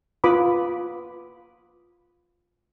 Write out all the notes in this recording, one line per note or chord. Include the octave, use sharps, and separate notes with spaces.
F4 B4 B5 D6 D#6